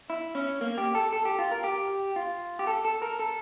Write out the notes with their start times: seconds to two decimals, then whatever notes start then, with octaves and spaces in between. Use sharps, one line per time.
0.10 E4
0.35 C#4
0.61 A#3
0.78 G4
0.95 A4
1.13 A4
1.25 G4
1.39 F4
1.51 A#4
1.64 G4
2.16 F4
2.59 G4
2.67 A4
2.85 A4
3.02 A#4
3.19 A4